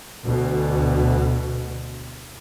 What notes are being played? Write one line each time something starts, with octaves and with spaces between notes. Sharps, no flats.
D2 B2